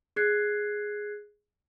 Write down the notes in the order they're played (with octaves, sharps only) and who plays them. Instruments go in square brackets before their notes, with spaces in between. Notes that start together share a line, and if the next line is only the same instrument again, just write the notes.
[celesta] G#4 F#6 G#6 C7